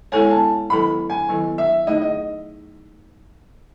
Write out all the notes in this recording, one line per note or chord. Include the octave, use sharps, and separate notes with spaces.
G#3 B3 E4 A4 C#5 G#5
A5
D#3 F#3 B3 E4 A4 B5
G#5
D#3 F#3 B3 E4 A4
E5
A3 D#4 G#4 D#5
D#5